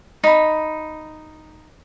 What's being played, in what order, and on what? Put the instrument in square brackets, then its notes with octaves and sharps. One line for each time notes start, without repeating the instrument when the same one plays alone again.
[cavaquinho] D#4 B5